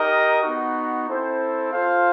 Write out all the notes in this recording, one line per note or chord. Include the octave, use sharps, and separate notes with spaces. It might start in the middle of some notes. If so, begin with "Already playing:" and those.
Already playing: D#4 G4 A#4 D#5
B3 D#4 F#4
C4 E4 A4 C5
F4 A4 C5 F5